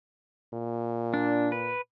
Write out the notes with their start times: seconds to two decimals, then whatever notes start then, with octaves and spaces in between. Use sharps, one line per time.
0.53 A#2
1.14 D4
1.52 B4